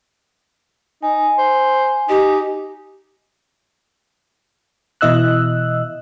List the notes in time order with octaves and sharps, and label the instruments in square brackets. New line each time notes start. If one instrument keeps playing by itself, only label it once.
[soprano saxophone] D#4 [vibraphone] G#5
[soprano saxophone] C5
[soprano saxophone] D#4 [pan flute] G4
[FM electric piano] B2 E3 E4 D#5 E6 F#6